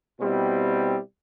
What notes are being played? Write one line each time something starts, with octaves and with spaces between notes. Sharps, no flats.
B2 G3 C4 E4